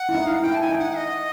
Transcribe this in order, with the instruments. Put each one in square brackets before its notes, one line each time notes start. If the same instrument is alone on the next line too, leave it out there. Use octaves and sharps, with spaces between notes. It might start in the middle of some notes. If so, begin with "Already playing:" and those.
Already playing: [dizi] F#5
[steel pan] E4
D#4
[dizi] F5
F#5
[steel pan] E4 [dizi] G5
[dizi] A5
G#5
[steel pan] D#4 [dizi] G5
[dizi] F#5
D#5